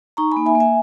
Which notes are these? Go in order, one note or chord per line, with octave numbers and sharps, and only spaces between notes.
D#4 A#5 C#6
G#5 B5
A#3
E5 G#5
A#3
E5 G#5